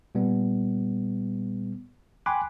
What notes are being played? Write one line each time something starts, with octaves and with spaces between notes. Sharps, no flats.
A#2 G3 B3
G5 G#5 B5 C6 D6 F#6